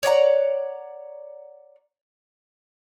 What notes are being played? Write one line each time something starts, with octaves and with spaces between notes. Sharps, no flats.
C#5 D5 F#5 A#5